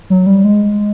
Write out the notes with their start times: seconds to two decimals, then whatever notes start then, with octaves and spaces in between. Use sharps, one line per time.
0.10 F#3
0.26 G3
0.44 G#3